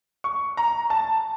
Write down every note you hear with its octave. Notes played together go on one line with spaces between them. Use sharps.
C#6
A#5
A5